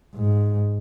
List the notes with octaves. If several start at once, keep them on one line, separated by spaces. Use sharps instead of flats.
G#2